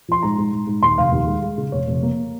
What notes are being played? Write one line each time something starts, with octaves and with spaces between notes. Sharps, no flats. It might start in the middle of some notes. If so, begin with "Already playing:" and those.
F3 C6
G#2 A#5
G#2
G#2
G#2
D#2 C6
F1 F5
D#2
G#3
G#3
C#3
F1 C#5
F1
A#3